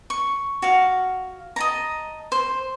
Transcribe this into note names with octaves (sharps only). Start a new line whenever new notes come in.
C#6
F#4 F5
D#5 A5 A#5
C5